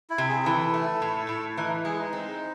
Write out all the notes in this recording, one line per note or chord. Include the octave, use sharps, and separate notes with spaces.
E4
C3
G#4
G#4
E3 A4
A3
A2
A2
E3 D#4
G#3 G#4
D#4
C4